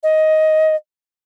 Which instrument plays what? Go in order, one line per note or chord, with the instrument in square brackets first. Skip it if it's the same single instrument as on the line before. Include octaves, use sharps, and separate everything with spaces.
[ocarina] D#5